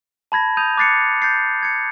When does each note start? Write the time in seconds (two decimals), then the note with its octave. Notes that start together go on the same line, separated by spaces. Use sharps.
0.32 A5 B5 G#6 A#6
0.57 D#6 G6 D#7 F7
0.77 D6 F#6 A6 C7 C#7
1.22 G6 A6 C7
1.63 G#6 C#7